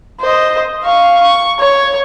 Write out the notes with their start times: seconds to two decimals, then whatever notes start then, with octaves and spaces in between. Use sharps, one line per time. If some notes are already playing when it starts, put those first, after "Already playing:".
0.21 C5 D#5
0.83 F5 C#6
1.21 C#6
1.59 C#5